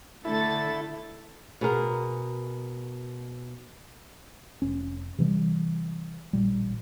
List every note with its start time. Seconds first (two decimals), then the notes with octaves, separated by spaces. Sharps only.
0.25 D3 A3 E4 A4 A6
1.61 B2 G#4 A#4
4.62 F1 C#4
5.18 C3 E3 G3
6.33 A1 A#2 G3